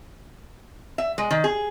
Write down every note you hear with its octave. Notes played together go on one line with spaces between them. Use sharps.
E5
G#3
D#3
G#4